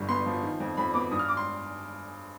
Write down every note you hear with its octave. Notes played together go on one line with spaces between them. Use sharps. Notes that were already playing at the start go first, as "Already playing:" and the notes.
Already playing: G1 G2 G3
B3 C6
F3
D#3
F2
F2 B5
B3 D6
G2 D#6
F6
D6
C6